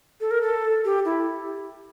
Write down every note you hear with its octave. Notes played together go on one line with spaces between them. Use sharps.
A4
A#4
A4
G4
E4